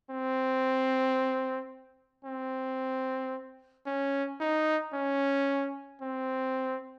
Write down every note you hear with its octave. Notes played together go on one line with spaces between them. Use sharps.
C4
C4
C#4
D#4
C#4
C4